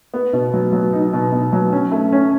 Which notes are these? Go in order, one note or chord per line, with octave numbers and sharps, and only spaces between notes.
B3
B2
F#3
F#3
D#4
B2
B2
F#3
C#4
A3
C#4